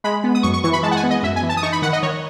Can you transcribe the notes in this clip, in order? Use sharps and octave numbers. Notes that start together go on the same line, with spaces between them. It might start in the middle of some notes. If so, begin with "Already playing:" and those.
G#3 B5
B3
D#6
F#2 C#6
C#6
E3 C#6
B5
G#3 A5
F#5
G#5
B3
D#5
F#2 E5
G#5
E3
A5
D#6
D#4 C#6
B5
D#3 F#5
D#5
D#3 C#5